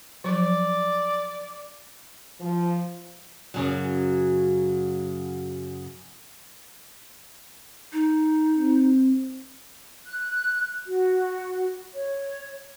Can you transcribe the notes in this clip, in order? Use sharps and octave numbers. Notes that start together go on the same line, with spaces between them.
F3 F#3 D5
F3
F#2 C#3 F#3
D#4
C4
F#6
F#4
C#5